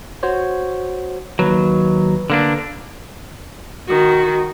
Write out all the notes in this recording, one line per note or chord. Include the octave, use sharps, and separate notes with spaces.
F#4 C5 C#5
D#2 F#3 B4
D3 A#3 D4
D#3 F#4